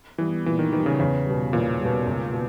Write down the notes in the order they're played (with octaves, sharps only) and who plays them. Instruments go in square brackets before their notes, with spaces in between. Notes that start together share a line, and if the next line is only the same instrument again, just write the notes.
[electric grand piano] E3 [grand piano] G3 B3
[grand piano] A#2 [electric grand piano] E3
[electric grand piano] D#3
[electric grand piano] D#3 [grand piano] G3 B3
[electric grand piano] C#3
[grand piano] E2 [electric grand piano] C#3
[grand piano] B2 G3
[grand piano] E2 [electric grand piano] A#2
[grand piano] B2 G3
C#2
B2